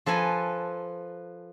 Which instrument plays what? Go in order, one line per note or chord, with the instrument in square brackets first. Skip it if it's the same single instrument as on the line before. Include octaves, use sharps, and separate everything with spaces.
[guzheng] F3 A4 B4 G#5 A#5